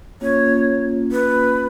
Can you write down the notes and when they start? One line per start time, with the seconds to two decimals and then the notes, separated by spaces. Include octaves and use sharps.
0.21 A#3 C#4 F4 C#5
1.12 B4